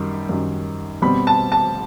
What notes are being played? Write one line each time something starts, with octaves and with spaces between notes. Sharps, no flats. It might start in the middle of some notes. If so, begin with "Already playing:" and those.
Already playing: F#2 D#3 G3
F#2 D#3 G3
B2 G3 C4 B5
A5
A5